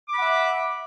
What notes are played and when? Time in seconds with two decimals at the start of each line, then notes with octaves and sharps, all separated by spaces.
0.08 D6
0.13 B5
0.18 F#5
0.22 E5